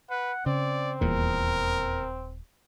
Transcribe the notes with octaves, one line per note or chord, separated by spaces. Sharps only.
B4 F#5
C#3 C4 D5
D#1 E2 A#2 A#4